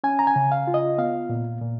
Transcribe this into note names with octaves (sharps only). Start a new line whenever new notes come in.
C#4 G#5
A#5
G#5
C#3
F5
F4
D#5
B3 F5
A#2
A#2